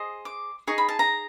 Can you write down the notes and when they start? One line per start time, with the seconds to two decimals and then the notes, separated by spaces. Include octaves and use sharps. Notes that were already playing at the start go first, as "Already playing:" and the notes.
Already playing: G#4 C5 D#5
0.25 D6
0.67 D#4 G#4 C#6
0.78 B5
0.89 A5
0.99 A#5